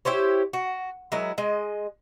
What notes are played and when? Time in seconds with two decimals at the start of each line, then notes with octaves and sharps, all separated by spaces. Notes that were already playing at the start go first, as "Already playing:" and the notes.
0.05 E4 G4 C5 C#5
0.53 F#4
1.12 F#3 G#3 E4 A#4
1.38 G#3 D#5